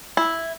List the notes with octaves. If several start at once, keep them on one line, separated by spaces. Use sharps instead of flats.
E4